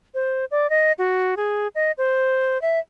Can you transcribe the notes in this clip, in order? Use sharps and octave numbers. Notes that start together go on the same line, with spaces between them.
C5
D5
D#5
F#4
G#4
D#5
C5
E5